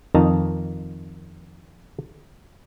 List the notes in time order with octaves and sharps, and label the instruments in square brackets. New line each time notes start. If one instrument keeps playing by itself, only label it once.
[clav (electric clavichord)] F2 D#3 D#5 A5 A#5